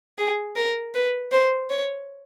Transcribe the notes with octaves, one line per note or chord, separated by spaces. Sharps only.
G#4
A#4
B4
C5
C#5